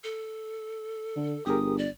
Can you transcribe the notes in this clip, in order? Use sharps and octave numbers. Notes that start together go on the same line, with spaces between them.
A4
D3
G1 G4 G#4 A#4 D#6
D5